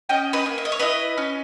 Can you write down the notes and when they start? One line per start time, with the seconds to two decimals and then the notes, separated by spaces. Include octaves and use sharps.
0.09 C#4 D#5 G5
0.33 B4 D#5
0.46 A#3
0.58 E5
0.65 D#5
0.72 C#5
0.79 E4 B4 D#5
1.18 C#4